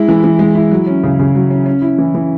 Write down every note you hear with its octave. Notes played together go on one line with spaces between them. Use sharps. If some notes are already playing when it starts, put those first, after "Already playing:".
Already playing: G#3 E4
E3
E3
G#3
E4
F#3
C#4
C#3
C#3
F#3
C#4
C#4
E4
E3
E3